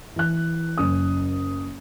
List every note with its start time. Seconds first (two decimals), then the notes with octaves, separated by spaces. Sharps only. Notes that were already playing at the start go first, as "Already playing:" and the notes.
0.16 E3 F#6
0.78 F#1 C#4 D#6